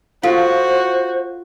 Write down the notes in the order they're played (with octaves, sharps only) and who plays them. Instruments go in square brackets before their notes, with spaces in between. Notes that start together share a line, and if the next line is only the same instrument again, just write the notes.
[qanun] F4 [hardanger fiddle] F#4 [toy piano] A4 F5 [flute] C5